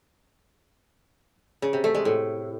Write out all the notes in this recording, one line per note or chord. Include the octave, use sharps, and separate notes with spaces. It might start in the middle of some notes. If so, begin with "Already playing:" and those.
C#3
C3
A3
G#3
A2